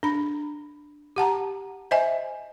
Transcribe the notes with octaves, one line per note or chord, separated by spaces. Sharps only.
D4 B5
G4 F#5 A5 A#5
C5 D#5 E5 G#5